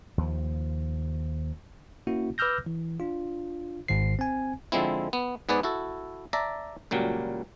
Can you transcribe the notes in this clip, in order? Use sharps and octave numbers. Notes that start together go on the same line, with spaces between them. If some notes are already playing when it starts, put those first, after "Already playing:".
D#2 F3
A#3 C#4 E4 F#4
B4 D6 E6 F6 G6 A#6
E3
D4 F4
G#1 G#2 D#3 C5 C7
C4 G#5
D3 F3 G#3 C4 E4
B3
G#2 B3 G#4 B4 D5
E4 F#4 A4
D5 E5 A5 A#5
C#2 A#2 F#3 G3